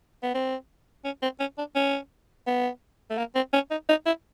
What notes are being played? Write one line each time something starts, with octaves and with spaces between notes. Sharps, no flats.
B3
C4
C#4
C4
C#4
D4
C#4
B3
A3
A#3
C4
C#4
D#4
D#4
E4